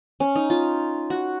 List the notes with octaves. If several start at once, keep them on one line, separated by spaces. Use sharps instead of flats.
C#4
D#4
F4
F#4